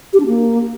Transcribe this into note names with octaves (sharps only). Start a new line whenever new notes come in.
G4
D4
A#3